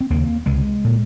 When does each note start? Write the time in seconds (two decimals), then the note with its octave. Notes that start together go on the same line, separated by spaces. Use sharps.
0.01 C4
0.10 D#2 C#3 A#3
0.46 C#2 C3 G#3
0.85 A#2